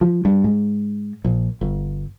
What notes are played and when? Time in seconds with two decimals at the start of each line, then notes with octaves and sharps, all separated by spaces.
0.01 F3
0.25 G2
0.44 G#2
1.25 A#1
1.61 G1